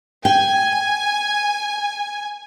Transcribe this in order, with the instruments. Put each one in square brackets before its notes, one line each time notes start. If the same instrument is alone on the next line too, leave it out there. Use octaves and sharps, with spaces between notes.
[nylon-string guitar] G5 [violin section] G#5